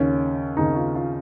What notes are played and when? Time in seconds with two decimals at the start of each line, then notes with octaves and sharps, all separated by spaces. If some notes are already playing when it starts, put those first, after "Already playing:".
Already playing: D#2 C#3 C#4
0.57 D#2 C#3 D#4
0.76 F4
0.95 F4